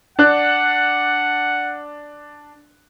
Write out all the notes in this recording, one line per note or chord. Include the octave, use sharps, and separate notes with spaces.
D4 F#5 F#6